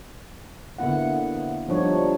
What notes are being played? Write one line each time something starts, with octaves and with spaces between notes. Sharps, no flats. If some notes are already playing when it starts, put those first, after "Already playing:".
D3 A#3 B3 E4 F#5
F3 G3 D4 D#4 C#5